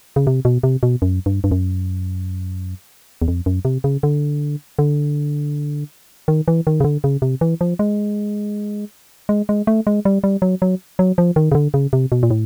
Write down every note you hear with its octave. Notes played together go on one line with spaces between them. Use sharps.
C#3
C3
B2
C3
B2
F#2
G2
G2
F#2
E2
F2
F#2
C3
C#3
D3
D3
D#3
E3
D#3
C#3
D3
C#3
C3
E3
F3
G#3
G#3
G#3
A3
G#3
G3
G3
F#3
F#3
F#3
F3
D#3
C#3
D3
C#3
C3
B2
A#2
A2